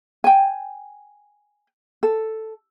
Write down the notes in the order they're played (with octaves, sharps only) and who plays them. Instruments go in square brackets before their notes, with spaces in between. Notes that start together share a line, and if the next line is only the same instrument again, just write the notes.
[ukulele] G5 G#5
A4